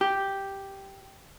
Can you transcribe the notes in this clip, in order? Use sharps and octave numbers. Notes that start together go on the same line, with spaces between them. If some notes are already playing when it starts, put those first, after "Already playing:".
G4